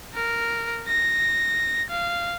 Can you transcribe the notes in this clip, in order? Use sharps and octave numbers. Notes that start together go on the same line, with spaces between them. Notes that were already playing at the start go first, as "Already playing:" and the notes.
A#4
A#6
F5